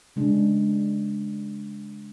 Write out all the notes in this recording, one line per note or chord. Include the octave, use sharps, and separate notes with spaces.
C#3 G#3 D4